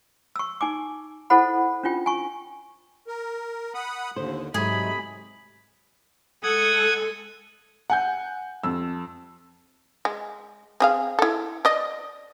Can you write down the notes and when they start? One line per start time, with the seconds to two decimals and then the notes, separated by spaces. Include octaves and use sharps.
0.36 C#6 E6
0.61 D#4 G#5 D6
1.30 E4 A4 C5 F#5 B5
1.83 C#4 D4 F4 G5
2.06 G#5 C#6
3.07 A#4
3.74 F#5 B5 D#6
4.16 D#2 D3 C5
4.54 G#2 C3 F#3 A3 G#4 D#5 B5
6.43 G#3 A4 F#5 D#6 G#6
7.90 F#5 G#5 G6
8.64 F2 E6
10.05 G#3
10.80 C4 G#4 F5
11.19 E4 A4
11.65 D5 D#5